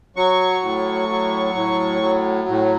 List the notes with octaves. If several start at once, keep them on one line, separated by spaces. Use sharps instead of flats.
F#3 C#6
A2
F#3
A2
F#3
A2